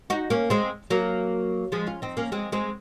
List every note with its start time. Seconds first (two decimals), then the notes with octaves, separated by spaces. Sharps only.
0.10 D#4 F#4
0.30 A#3 C#4
0.50 G#3 C4
0.90 F#3 A#3
1.72 F3 G#3
1.87 C#4 F4
2.02 C4 D#4
2.17 A#3 C#4
2.32 G#3 C4
2.52 G#3 C4